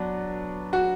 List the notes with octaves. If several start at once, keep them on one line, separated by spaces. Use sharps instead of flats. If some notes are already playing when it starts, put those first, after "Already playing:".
Already playing: F#3 B3 D4
F#4